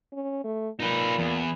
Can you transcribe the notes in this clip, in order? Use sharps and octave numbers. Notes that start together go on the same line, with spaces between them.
C#4
A3
A#2 D#4 B4
E2